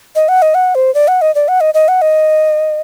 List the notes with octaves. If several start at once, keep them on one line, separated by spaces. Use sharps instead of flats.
D#5
F#5
D#5
F#5
C5
D5
F#5
D#5
D5
F#5
D#5
D#5
F#5
D#5